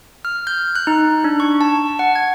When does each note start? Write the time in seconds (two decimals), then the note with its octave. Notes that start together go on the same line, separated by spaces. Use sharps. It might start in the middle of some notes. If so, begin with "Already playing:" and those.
0.25 F6
0.47 G6
0.76 F#6
0.87 D#4
1.24 D4
1.40 C#6
1.61 A5
1.99 F#5
2.15 G#6